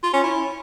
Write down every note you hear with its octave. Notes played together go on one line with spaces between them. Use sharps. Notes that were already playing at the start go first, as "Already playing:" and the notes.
F4
C#4
E4